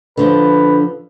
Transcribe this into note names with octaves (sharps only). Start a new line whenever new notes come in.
D3 F3 F4 B4